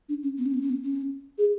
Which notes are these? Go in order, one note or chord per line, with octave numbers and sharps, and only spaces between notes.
D4
C#4
B3
C#4
B3
C#4
B3
C#4
G#4